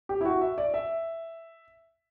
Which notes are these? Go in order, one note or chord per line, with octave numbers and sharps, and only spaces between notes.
G4
E4
F#4
E5
D5
E5